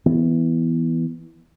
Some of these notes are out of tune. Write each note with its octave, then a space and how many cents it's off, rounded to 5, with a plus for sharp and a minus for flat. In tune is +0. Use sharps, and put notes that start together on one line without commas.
E3 +0 B3 +0